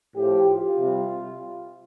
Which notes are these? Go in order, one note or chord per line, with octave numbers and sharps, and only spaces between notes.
A2 F3 G4
F4
C3 G3